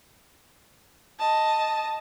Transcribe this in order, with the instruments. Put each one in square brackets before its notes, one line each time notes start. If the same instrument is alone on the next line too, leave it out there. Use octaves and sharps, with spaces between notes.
[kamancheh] D#5 A5